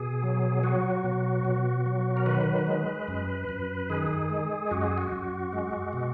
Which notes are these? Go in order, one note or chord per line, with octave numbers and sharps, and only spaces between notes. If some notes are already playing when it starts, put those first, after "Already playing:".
Already playing: B2 G#4
F#3
F#3 F#4
B2
B2
F#3
A#4
D#3 B4
G#3
F#2
F#2
D#3 G#4
G#3
F#2 F#4
G#4
F#4
F#2
G#3
B2